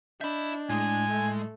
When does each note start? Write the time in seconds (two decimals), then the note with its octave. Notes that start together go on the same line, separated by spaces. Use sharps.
0.21 D4 D#5 E5 B5 G6
0.70 A2 G#3 G#5 D#6
1.10 A3